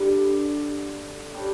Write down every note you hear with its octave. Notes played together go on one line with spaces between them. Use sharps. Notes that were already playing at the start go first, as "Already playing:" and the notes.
Already playing: D3 G3 D4 A4
G3 D4 G4 C#5